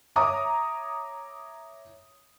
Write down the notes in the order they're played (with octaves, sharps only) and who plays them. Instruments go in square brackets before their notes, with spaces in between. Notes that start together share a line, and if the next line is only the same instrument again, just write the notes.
[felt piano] C#5 E5 A#5 D6 D#6